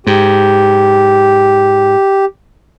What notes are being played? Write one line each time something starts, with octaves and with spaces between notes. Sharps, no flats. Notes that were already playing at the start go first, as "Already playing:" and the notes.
G#2 G4